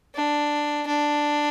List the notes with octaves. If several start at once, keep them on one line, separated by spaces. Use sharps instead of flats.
D4
D4